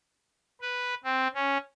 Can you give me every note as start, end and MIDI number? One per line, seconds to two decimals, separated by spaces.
0.61 0.94 71
1.04 1.28 60
1.35 1.58 61